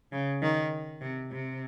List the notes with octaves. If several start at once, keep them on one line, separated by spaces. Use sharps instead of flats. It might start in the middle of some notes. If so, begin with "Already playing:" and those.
C#3
D#3
C3
C3